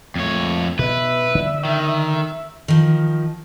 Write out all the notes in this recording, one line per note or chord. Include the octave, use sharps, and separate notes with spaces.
F2 A3 C#5
B2 B4 E5
D3
D#3
D#3 F3